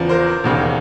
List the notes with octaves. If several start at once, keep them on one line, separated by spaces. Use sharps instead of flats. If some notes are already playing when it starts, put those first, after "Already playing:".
Already playing: E2 C#3 F3
A#4 C5
E1 D#2 C#3